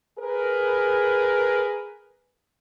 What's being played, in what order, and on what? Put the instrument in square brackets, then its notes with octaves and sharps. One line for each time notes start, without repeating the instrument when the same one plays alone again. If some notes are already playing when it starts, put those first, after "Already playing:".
[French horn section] G#4 A#4 B4